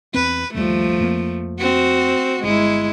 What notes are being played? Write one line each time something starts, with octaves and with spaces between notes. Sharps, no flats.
E2 C4 B4
G1 D#2 F3 G3 A3
F2 A#3
C4 F#4
G1 G#3 E4